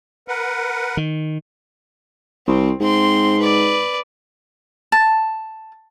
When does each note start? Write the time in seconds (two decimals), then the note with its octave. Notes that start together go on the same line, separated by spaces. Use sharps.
0.28 A#4 B4 F#5
0.97 D#3
2.47 C2 C4
2.81 G#2 C4 C6
3.40 B4 D5
4.92 A5